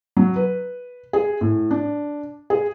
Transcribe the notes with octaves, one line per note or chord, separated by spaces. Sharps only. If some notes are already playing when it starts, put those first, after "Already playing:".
F#3
B4
G#4
A2
D4
G#4